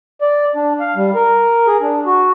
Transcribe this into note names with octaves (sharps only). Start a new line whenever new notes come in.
D5
D4
F5
G3
A#4
G#4
D4
F#4